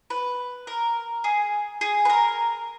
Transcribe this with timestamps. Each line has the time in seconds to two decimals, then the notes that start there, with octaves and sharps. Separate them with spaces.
0.10 B4
0.67 A#4
1.24 G#4
1.81 G#4
2.05 B4
2.09 A#4